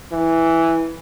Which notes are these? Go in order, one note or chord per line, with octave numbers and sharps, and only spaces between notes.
E3